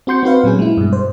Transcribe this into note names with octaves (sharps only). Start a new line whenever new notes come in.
C4 F#4 C6 G6 C#7
C4 D#4 F#4 B4 F5
A#2 F#3 C#4 G#4
G#3 E4
G2 B2
C5